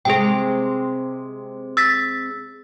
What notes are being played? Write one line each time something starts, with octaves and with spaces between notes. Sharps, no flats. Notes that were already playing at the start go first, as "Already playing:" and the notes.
C3 G#3 G#4 G5
E6 A6 B6